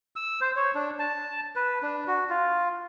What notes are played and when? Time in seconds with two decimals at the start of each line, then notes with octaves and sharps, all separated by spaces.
0.16 E6
0.41 C5
0.56 C#5
0.75 D4
0.99 A5
1.56 B4
1.82 D4
2.07 F#4
2.30 F4